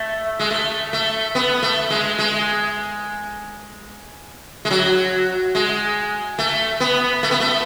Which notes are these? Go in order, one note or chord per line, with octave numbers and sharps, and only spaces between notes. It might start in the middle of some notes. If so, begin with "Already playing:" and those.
Already playing: A3
G#3
A3
A3
B3
A3
G#3
G#3
G#3
F#3
G#3
A3
B3
A3
B3
A3